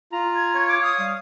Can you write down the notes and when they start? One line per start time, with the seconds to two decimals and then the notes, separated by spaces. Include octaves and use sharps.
0.12 F4 A#5
0.36 G#6
0.55 C#5
0.69 D6
0.82 F5 D#6
0.99 G3 F5